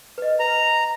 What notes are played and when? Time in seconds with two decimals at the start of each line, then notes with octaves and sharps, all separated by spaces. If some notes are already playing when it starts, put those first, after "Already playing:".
0.18 B4 D#5
0.40 B4 A#5